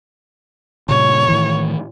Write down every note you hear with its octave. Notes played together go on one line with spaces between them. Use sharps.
G2 A#2 C#3 C#5
A2 D#3 E3